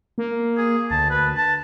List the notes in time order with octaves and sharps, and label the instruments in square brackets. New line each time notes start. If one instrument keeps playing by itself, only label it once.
[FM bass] A#3
[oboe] G#4
[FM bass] D2 [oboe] A5
[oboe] B4
A5